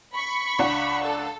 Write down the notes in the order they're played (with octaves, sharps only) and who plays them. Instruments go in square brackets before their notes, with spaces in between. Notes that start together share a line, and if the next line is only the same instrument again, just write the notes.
[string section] B5 C#6
[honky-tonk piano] C#2 D4 F#5
[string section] A4